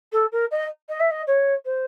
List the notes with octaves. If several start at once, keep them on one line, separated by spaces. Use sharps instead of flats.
A4
A#4
D#5
D#5
E5
D#5
C#5
C5